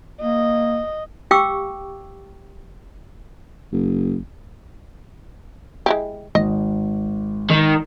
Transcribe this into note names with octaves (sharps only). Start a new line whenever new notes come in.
A#3 D#5
G4 F5 G5 C#6 D6 E6
F#1
G#3 E4 G4
G#1 D#5
D#3